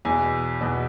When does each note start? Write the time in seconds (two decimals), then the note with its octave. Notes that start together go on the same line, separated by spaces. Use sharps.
0.05 E2 B2 G#5
0.61 E2 B2